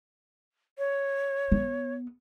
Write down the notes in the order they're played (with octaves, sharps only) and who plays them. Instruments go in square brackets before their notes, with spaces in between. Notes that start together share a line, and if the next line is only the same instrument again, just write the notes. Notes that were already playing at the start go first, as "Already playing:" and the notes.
[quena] C#5
[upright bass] B3